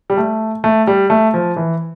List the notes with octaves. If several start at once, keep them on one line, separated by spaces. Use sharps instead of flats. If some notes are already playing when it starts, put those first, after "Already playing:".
G3
A3
A3
G3
A3
F3
E3